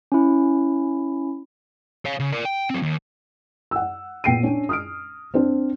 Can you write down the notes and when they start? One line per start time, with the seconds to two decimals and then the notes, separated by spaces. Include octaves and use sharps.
0.12 C#4 E4
2.05 C#5 F5
2.20 C#3
2.32 A#4 D5
2.45 G5
2.70 F#3 C4
2.82 D#2
3.71 F#5 E6
4.24 A#2 B3 G5 C7 D7 D#7
4.43 C#4 D4
4.69 D#6 F6 D7
5.34 C4 D4 C5